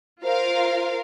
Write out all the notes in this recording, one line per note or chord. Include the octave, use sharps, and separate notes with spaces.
F4 A#4 C5 F5